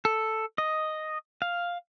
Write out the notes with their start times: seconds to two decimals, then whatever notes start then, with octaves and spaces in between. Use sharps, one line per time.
0.05 A4
0.58 D#5
1.42 F5